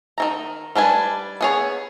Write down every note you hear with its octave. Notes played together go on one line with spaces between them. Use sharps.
D#3 E3 A#5
G3 D4 B4 G#5
B3 G#4 C#5